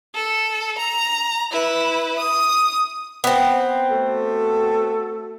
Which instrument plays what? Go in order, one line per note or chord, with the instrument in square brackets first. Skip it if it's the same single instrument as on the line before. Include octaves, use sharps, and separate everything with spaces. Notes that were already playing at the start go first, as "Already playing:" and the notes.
[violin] A4
A#5
E4 B4
D#6
[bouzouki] B3 C4
[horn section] A3 F#4 A4